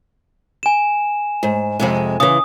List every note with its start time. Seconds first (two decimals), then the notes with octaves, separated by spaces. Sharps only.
0.63 G#5 E7
1.43 G#2
1.80 F2 C3 G#3
2.20 C#3 E3 D#6